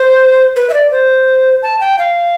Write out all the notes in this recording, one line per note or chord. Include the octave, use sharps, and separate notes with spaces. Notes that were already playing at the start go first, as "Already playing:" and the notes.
Already playing: C5
B4
E5
D5
C5
A5
G5
F5